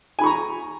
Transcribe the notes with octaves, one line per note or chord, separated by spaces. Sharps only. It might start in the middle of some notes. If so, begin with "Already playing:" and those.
G#5 A#5 B5 C#6